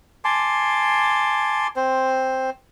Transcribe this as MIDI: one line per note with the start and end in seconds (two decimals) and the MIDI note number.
0.25 1.67 80
0.25 1.67 81
0.25 1.67 84
0.25 1.67 86
1.76 2.50 60
1.76 2.50 72